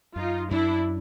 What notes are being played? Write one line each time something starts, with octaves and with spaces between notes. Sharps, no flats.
F#2 D#4 F4
F#2 D4 E4